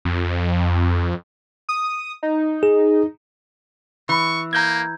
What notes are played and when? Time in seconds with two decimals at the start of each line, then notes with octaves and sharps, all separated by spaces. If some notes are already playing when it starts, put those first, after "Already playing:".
0.05 F2
1.69 D#6
2.23 D#4
2.63 G#4
4.09 E3 C#6
4.53 A#3 A#5 G6 G#6